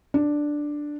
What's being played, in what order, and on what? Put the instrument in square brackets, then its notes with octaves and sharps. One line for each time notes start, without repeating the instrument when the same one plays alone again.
[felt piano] D4